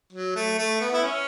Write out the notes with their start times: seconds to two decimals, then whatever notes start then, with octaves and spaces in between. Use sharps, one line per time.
0.12 F#3
0.36 A3
0.58 A3
0.80 B3
0.93 E4
1.03 C#4